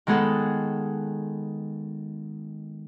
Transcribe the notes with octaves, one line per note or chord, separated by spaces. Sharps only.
D#3 G#3 B3 G#4 A4 F#5